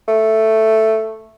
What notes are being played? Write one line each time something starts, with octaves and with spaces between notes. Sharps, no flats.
A3